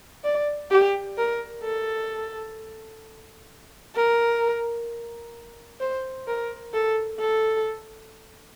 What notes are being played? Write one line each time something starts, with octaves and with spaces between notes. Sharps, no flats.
D5
G4
A#4
A4
A#4
C5
A#4
A4
A4